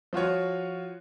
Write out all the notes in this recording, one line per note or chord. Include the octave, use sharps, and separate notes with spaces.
F3 F4 F#4 C#5